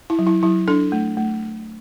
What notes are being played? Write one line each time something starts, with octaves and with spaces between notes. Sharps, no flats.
E4
F#3
E4
F#3 E4
D4 A4
A3
A3